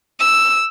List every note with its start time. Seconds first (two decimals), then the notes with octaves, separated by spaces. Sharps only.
0.20 E6